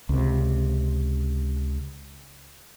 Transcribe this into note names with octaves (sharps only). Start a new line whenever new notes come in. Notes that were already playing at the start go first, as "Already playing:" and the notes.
C#2 C3